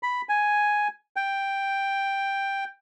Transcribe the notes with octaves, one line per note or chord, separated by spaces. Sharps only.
B5
G#5
G5